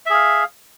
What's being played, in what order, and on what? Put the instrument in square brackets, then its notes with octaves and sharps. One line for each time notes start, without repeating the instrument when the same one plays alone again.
[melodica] E5
G#4
F5